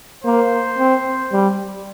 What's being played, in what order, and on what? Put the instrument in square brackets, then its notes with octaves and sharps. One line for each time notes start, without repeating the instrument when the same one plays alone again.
[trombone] A#3 [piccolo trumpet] C5
[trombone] C4
G3